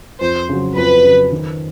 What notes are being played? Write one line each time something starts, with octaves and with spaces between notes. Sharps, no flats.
F2 C5
C#3 F#3
F2 B4
C#3 F#3
D#3